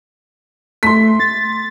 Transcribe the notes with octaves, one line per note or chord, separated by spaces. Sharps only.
A3 C6 B6
A6